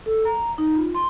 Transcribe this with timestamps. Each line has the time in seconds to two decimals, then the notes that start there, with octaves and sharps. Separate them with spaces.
0.06 A4
0.25 A#5
0.58 D#4
0.75 F4
0.95 C6